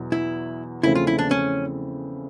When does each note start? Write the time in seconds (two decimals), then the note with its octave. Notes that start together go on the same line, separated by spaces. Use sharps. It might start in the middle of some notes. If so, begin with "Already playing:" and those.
Already playing: E2 B2 F#3
0.12 E4
0.83 E2 C#3 F3 A3 C4 E4
0.95 F4
1.07 E4
1.19 D4
1.31 C#4